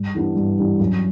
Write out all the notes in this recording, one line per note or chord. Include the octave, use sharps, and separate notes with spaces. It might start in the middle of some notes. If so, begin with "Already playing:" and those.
Already playing: G2
E3 G3 B3 D4
G2
E3 G3 B3 D4
F#2